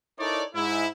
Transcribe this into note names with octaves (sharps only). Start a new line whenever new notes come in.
D#4 E4 A4 A#4 C#5 D5
G#2 G#3 E4